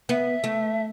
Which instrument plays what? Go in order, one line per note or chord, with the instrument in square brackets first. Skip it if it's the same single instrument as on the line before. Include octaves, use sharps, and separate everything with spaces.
[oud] B3 [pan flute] E5
[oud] A3